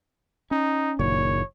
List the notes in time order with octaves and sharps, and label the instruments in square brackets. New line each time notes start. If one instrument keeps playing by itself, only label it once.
[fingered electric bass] C#4 [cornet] D#4
[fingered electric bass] F#1 A#2 D#3 [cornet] C#5